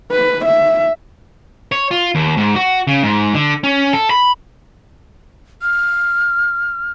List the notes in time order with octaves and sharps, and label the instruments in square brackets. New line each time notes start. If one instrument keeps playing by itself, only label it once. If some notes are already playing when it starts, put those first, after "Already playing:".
[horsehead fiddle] B4
E5
[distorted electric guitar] C#5
F4
D#2
G#2
F#4
C#3
G#2
D3
C#4
A4
B5
[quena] F6